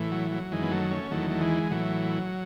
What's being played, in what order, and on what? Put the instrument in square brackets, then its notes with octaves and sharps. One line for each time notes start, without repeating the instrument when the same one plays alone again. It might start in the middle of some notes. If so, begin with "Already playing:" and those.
Already playing: [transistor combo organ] A2 E3
F#3
F#3
F#2 D#3 E3 G#3
B3
F#3 A3
A3 C#4
E2 D#3 F#3 A3
A3
E3 G#3
A2 E3 F#3